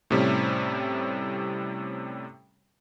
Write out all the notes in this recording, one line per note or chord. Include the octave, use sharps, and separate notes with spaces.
A2 C3 G3 C#4